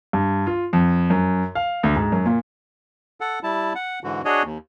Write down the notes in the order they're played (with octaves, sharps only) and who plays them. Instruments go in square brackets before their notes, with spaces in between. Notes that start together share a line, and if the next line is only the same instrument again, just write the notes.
[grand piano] G2
F4
F2
F#2
F5
D2
G#2
F#2
A#2
[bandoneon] A4 F#5
G3 E4 A5
F#5
G#2 D3 E3 F#4
D4 F#4 G#4 C#5 D#5
D#2